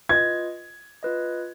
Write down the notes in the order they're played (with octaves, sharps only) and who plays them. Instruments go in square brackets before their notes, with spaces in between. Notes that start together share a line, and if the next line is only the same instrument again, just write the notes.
[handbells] F4 B4 D#5 [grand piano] G#6
[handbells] F4 B4 D#5